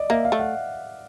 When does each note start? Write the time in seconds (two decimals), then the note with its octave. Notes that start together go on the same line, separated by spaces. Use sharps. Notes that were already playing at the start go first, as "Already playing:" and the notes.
Already playing: D5 D#5
0.10 A#3 E5
0.25 F5
0.32 A3
0.39 F#5